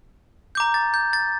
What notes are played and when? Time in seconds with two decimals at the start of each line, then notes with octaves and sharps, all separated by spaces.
0.55 A#5 D6 G6
0.74 A6
0.94 G6
1.13 A6